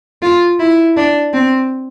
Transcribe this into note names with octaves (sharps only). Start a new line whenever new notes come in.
F4
E4
D4
C4